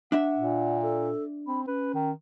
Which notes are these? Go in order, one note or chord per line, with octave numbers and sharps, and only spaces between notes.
D4 E5 F#5
A#2
A4
C4 B5
C#4 B4
D#3